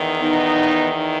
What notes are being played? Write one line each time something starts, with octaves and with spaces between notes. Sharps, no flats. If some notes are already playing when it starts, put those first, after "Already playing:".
Already playing: E2 D#3
B3 D#4